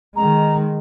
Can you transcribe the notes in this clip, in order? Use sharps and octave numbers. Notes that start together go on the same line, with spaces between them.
D#3 G#3 A#5